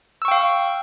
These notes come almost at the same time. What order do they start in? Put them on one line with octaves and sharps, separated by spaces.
E6 C#6 G5 F5